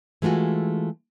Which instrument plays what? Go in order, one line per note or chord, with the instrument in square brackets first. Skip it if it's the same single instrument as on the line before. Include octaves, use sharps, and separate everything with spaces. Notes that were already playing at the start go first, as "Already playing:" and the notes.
[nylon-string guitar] E3 G#3 A3 F4 F#4